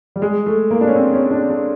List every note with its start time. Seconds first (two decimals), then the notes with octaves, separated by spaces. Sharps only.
0.16 G3
0.22 G#3
0.46 A3
0.71 A#3
0.81 D4
0.88 C#4
0.95 C4
1.14 C#4
1.31 D4
1.49 D4